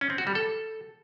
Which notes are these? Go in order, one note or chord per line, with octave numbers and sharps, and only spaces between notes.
C#4
C4
F#4
G3
A4